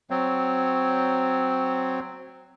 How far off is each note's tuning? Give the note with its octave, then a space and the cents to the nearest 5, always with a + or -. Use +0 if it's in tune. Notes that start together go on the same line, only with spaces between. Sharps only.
F#3 +0 C4 +0 C#5 +0